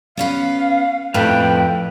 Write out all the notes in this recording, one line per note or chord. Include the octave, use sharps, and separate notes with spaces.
B3 C#4 B4 F5
F2 A2 B4 F5 G5